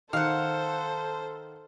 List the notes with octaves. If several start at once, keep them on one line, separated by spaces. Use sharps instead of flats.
D#3 A4 C5 F5 F#5